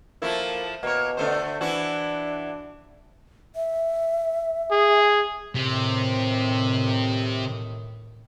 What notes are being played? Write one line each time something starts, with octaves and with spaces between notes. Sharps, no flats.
F3 A3 A#3 E4
B2 A#3 C#5
D3 A3 C5
E3 D4 E4 F#4
E5
G#4
A2 C3 D#3